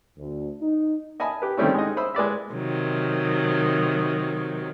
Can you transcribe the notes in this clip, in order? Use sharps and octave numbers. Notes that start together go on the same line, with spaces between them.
D2
D#4
D#5 G#5 A5 B5 D#6
G4 B4
D#3 G3 A3 C4 C#4 E4
G#3 D#4 D#5
C5 B5 D#6 E6
G#3 B4 D5 E5
C3 D#3 F#3